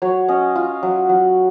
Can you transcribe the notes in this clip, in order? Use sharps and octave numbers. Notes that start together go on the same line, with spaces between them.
F#3 C#5
C#4 D#5
F4
F#3
F#3